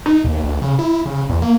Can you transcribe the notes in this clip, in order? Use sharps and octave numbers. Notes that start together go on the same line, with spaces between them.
D#4
D#2
D2
C#3
E4
C#3
E2
A#3